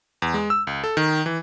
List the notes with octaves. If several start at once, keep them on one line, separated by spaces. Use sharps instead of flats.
E2
G#3
E6
C#2
A4
D#3
E3